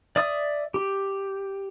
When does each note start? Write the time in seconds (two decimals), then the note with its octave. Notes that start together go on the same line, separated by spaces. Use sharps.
0.16 D5 E5 D#6
0.74 G4